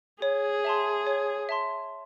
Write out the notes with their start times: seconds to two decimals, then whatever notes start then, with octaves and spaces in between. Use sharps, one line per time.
0.22 G#4 C#5
0.64 E5 A5 C6
1.07 C#5
1.49 E5 A5 C6